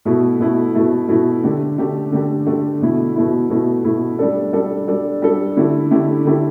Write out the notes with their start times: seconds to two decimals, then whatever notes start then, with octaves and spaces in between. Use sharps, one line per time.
0.05 B2 A3 E4
0.40 B2 A3 E4
0.75 B2 A3 E4
1.09 B2 A3 E4
1.43 D3 A3 G4
1.78 D3 A3 G4
2.12 D3 A3 G4
2.47 D3 A3 G4
2.81 B2 A3 E4
3.16 B2 A3 E4
3.50 B2 A3 E4
3.84 B2 A3 E4
4.19 G3 D4 A4
4.53 G3 D4 A4
4.88 G3 D4 A4
5.22 G3 D4 A4
5.57 D3 A3 E4 G4
5.91 D3 A3 E4 G4
6.25 D3 A3 E4 G4